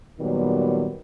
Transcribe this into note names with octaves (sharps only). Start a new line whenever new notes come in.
A#2 D#3 F#3 G3 B3